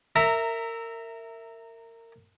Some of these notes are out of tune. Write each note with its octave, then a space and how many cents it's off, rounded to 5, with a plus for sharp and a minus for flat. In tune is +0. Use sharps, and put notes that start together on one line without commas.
A#4 -25 E5 +0 A#5 -15